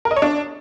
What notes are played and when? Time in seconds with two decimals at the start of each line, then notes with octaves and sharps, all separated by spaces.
0.05 A#4
0.11 D#5
0.16 C#5
0.22 D4